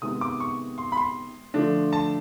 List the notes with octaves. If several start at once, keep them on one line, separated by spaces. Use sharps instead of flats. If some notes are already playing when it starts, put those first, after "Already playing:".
C3 D#3 G#3 B3 D#6
D6
C#6
C6
B5
C6
D3 F3 A3 D4
A5